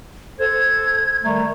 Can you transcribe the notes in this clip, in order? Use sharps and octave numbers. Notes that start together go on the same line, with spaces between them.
A4 C5 G#6
D#3 G3 A3 A#5